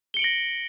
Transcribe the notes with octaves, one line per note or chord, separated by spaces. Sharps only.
A#6 C#7 D7 F#7 G7